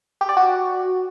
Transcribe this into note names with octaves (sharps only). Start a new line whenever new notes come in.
G4
D5
F#4